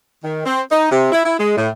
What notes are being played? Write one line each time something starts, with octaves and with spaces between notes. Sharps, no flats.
D#3
C4
D#4
C3
E4
E4
G#3
A2